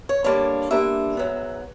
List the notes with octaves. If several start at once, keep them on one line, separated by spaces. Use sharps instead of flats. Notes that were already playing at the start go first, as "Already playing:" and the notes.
C#5
D3 G3 A#3 D4 C#5
D3 G3 A#3 D4 E5
G#2 D#3 F#3 B3